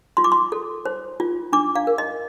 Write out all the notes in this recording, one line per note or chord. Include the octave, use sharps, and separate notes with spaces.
F4 C6
D6
C6
A4
C5
F4
D4 D6
F5
A#4
D#5